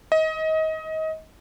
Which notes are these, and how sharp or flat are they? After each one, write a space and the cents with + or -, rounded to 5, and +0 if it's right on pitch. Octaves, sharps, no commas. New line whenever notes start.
D#5 +25